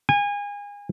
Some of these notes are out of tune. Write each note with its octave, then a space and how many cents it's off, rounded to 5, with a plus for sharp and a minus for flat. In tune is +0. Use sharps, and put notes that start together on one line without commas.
G#5 -30